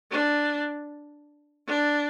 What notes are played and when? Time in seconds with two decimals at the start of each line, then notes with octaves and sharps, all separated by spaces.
0.11 D4
1.68 D4